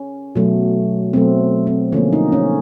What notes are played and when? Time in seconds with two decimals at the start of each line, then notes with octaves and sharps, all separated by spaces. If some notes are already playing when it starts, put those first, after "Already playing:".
Already playing: C#4
0.35 B2 F#3 A3
1.13 B2 F#3 A3 C4
1.67 C4
1.92 D3 F3 A#3 C#4
2.13 D#4
2.32 C#4